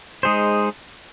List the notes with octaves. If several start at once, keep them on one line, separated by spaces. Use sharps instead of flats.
G#3 D#4 G#4 C5